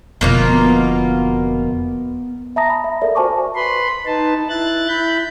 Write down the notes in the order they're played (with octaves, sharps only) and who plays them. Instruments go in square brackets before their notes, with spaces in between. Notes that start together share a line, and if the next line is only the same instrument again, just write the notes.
[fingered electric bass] F1 F2 D3 [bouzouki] B2 A#3 F4
[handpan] B3
[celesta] E5 A5 A#5 D#6 A#6
B5
E5
A4 A#4 D5 E5
F#4 C5 G#5 A5 C#6 D6
[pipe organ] B4 B5 C6
D#4 B4 A5
E4 F#6 A6
E4 B5 G6